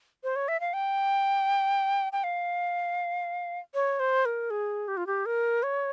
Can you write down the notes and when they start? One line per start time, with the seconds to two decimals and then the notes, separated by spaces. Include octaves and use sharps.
0.24 C5
0.36 C#5
0.48 E5
0.60 F5
0.74 G5
2.13 G5
2.24 F5
3.74 C#5
4.00 C5
4.25 A#4
4.50 G#4
4.88 G4
4.97 F4
5.07 G4
5.26 A#4
5.63 C#5